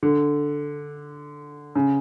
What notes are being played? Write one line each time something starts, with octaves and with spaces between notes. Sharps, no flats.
D3
C#3